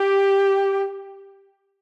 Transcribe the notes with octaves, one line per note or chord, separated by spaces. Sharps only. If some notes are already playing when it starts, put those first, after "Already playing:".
Already playing: G4